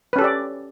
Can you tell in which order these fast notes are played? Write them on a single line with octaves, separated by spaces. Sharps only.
B4 C#4 A4 G4 D5